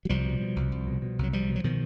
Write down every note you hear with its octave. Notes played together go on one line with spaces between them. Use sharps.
F#3
C2 F3 G3
B2
B2
C2
C2
B2
B2
C2 F#3
C2 F3 G3
B2
F#3
B2 D#3 F3